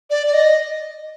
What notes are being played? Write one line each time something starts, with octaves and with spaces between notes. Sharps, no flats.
D5
D5
D#5